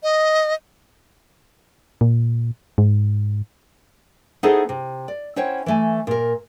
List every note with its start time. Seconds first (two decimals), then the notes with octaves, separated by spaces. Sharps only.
0.03 D#5
2.01 A#2
2.78 G#2
4.43 B3 D#4 E4 G#4 A4 C5
4.69 C3
5.08 D5
5.36 C#4 E4 C5 C#5 F#5 G5
5.66 E3 A3 G#5
6.07 A#2 A#4